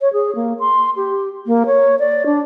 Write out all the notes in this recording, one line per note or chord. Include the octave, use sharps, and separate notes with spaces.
C#5
G#4
A#3
C6
G4
A#3
C#5
D5
D4